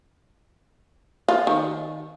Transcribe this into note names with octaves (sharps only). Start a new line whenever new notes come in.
F4
D#3